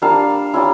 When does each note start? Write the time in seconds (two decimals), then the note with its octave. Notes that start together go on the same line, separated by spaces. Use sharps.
0.02 G3 A#3 D4 F5 A5
0.54 G3 C#4 E4